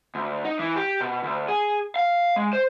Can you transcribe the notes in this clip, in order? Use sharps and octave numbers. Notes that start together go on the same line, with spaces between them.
D2
D#4
E3
G4
B2
D2
G#4
F5
G#3
C5